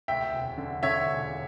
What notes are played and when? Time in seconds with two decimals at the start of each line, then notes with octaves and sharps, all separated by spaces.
0.08 D2 E5 G5
0.33 E1
0.58 D3
0.83 D3 C#5 E5
1.08 E1